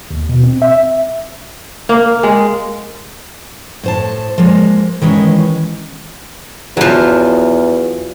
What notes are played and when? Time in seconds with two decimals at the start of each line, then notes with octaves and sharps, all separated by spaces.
0.11 D#2
0.29 B2
0.43 C4
0.62 E5
1.89 A#3
2.23 G#3
3.83 A2 C5 A5
4.38 F3 G#3 A#3
5.02 D#3 E3 G#3 C#4
6.77 E2 F3 F#3